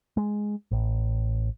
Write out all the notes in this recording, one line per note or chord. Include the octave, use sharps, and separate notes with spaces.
G#3
A1